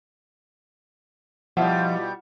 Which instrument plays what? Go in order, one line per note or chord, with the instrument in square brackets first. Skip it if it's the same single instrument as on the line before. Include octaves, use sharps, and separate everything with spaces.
[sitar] B2 G3 [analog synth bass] F3 [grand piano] E4 F4 E5 [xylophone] F#5